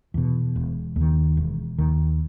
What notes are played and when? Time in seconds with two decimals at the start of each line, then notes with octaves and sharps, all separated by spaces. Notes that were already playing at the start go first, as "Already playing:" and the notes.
0.14 E2 B2
0.56 E1
0.96 D#2 D#3
1.37 E1
1.78 D#2 D#3